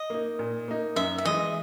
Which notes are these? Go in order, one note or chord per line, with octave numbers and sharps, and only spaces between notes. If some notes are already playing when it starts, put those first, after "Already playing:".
Already playing: D#5
A#3 D#4
A#2
A#3 D#4
F#2 E5
E5
E3 G#3 D#5